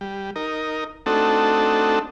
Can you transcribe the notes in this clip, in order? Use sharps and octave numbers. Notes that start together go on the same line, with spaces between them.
G3
D#4 A#4
A3 C4 D4 D#4 F#4 A4